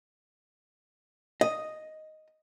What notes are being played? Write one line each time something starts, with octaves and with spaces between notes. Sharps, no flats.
D#5